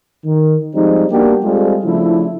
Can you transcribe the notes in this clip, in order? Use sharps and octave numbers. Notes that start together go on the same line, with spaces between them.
D#3
F3 G3 G#3 C4 D#4
G3 A#3 B3 D4 F#4 G4
G3 G#3 C4 F4 G#4 A4
C#3 F3 A3 D4 E4